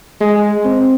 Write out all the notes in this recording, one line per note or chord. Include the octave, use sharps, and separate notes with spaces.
G#3
C4